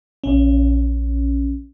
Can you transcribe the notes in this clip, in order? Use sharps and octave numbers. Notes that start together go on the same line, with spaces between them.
A#1 C#4